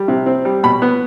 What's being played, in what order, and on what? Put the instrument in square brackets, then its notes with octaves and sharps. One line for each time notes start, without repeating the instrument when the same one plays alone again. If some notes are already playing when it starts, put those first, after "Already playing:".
Already playing: [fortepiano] G3
C3
C4
G3
B2 B5
B3